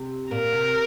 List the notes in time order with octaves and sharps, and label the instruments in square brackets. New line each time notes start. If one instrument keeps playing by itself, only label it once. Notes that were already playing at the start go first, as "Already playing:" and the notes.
Already playing: [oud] C3
[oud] A#2 [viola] A#4
[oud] C3